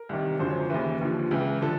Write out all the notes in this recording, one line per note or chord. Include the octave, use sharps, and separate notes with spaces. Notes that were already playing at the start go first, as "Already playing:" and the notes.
Already playing: A#4
C2 C3 D#3
G#1 F#2 D3 F3 C5
C#5
C5
D#2 C#3 E3 B4
D#2 D3 F3
C#2 C#3 E3
D3 F3 A4